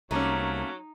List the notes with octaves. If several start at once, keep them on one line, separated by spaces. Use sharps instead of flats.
C2 F#3 A3 A#3 C#4 D#4